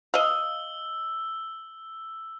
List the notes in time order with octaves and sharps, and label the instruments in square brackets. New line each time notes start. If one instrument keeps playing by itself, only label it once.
[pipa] D#5 F5 [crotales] E6 G7